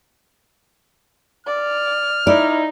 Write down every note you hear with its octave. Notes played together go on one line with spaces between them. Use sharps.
D5 F6
D#4 E4 D5